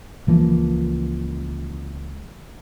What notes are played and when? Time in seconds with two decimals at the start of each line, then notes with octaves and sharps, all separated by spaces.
0.27 C#2 E3 F3 A#3